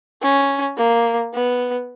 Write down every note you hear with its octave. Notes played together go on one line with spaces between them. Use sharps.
C#4
A#3
B3